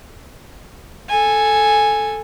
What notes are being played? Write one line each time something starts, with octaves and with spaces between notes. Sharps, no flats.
A4 G#5